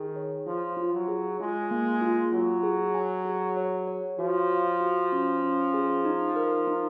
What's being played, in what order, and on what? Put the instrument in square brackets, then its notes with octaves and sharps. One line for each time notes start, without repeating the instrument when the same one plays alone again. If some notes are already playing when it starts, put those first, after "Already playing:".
Already playing: [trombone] D#3 [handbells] G#4
[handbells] C#5
[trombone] F3 [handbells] F4
[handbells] F4
[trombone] F#3
[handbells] G#4
[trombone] G#3 [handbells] F4
[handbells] A#3
F4
[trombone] F#3 [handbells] F4
[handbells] G#4
G#5
G#4
C#5
C#5
[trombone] F3 [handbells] F#4
[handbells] F5
F#4
C#4
C#4
G#4
D#4
A#4
D#4